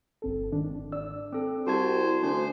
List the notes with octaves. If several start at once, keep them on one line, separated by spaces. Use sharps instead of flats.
G1 C4 A4
G#2 D#3 D4
D4 D5 E6
C4 A4
C2 F#4 C5 A5 G#6
D2 C#4 C5